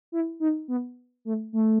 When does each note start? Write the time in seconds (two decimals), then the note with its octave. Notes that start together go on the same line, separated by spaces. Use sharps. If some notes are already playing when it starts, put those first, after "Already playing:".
0.12 E4
0.40 D#4
0.68 B3
1.25 A3
1.53 A3